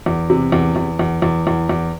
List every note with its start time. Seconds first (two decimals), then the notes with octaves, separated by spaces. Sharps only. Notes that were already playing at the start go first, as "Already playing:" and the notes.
0.06 E2
0.30 C3
0.52 E2
0.76 E2
0.99 E2
1.22 E2
1.47 E2
1.69 E2